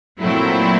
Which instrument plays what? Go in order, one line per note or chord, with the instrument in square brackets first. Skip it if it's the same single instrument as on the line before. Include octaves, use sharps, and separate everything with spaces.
[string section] A#2 F#3 A3 C4 E4